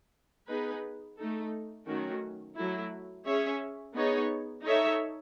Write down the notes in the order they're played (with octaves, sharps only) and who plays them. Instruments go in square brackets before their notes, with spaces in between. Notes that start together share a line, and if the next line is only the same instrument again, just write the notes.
[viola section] B3 D#4 G#4 B4
A3 D#4 A4
D#3 F#3 A3 C#4 F#4
F#3 A3 E4
C#4 G#4 C#5 E5
B3 D#4 G#4 C#5
D#4 A4 C#5 E5